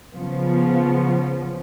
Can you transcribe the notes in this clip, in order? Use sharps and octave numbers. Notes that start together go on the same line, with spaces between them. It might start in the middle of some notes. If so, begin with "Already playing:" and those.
C#3 F3 B3